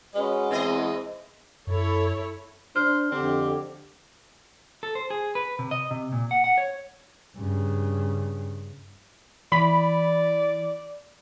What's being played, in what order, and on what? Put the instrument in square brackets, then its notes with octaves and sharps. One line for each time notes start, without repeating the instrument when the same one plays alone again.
[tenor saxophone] G#3 [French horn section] C#4 F#4 B4
[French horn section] E2 E3 [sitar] C4 E4 D#5
[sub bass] F#2 [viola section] E4 A4 C#5
[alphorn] D4 [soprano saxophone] C5 [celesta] F6
[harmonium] F2 G4 [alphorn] D3 [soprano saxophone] C4
[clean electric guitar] A4
C5
G#4
B4
C3
D#5
C3
A#2
F#5
F#5
C#5
[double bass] G2 C#3
[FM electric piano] E3 [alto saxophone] D5 [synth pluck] B5